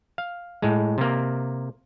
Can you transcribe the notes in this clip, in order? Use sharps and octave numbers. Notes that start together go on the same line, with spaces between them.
F5
A2 G#3
C3 A#3